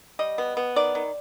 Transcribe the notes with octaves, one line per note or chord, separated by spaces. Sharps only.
G3 D#5
B3
B3
D#3 D5
D#3